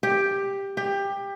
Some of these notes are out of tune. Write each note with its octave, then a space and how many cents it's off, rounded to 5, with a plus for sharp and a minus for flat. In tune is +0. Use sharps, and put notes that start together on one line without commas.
G4 +10
G4 +20